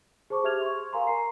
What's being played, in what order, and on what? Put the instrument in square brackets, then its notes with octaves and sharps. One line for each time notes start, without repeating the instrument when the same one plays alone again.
[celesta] G#4 C5 A5 C#6 D6
G4 G#4 E5 F6 G#6 F7
C6 C#6
A#4 F5 G#5 A#5 C6
A#4 A#5 C7